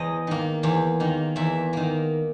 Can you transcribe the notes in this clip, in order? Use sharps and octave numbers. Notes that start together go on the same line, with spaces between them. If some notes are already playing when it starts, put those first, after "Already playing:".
Already playing: E2 D#5
D#3 A#3
E2
D#3 A#3
E2 E5
D#3 A#3